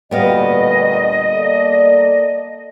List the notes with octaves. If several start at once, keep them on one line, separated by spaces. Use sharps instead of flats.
D2 A#2 G3 B3 D#5 F5
A#3 A4 D5